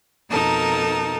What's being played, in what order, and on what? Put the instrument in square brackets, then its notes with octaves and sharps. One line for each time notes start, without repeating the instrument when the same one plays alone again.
[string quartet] F2 B2 D#4 A4 A#4 A5